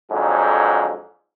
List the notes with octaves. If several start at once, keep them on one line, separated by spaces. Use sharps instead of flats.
F2 G#2 D3 F#3